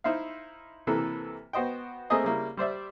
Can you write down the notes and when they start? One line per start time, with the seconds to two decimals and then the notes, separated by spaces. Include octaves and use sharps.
0.04 D#4 E4 C5 E5 F5
0.87 C3 E3 A#3 A4 B4
1.53 B3 F#4 C5 D#5 G5
2.10 A3 A#3 C4 G#4 D#5
2.23 C#3 G3 A#3 E4
2.57 G3 C5 D5 E5